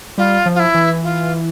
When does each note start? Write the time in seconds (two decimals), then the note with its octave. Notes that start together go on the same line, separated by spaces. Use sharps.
0.18 G3 F4
0.46 F3
0.55 F4
0.60 E4
0.74 E3
1.03 F4